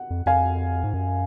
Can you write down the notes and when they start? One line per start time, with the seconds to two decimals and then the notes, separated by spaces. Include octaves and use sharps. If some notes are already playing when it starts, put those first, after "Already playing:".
Already playing: F#5
0.10 F2
0.26 F2 F5 G#5
0.84 G#2
0.94 F#2